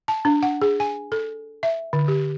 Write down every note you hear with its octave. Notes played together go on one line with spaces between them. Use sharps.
A5
D4
F#5
G#4
G#5
A4
E5
D3
G4